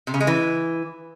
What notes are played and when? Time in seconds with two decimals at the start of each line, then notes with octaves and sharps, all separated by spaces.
0.07 C3
0.14 C#3
0.21 G#3
0.27 E3